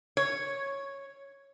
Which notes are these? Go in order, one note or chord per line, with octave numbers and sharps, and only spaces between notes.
C#5